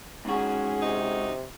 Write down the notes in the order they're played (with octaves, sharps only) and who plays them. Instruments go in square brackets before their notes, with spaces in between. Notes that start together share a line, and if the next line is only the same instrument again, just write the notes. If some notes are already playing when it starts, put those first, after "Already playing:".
[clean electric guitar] G#2 F#4 [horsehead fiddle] C#4 G#4
[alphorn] C3 [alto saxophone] D#4